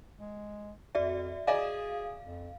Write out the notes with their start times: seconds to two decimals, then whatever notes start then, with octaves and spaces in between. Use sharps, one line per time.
0.19 G#3
0.95 F2 F#4 D5 E5
1.47 G#4 D5 D#5 F5 G#5
2.25 F2